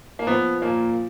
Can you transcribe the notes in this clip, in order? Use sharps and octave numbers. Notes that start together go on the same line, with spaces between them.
A#3
F3 B3
A#2 A#3